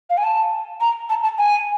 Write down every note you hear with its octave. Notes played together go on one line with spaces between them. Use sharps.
F5
G#5
A5
A#5
A5
A5
G#5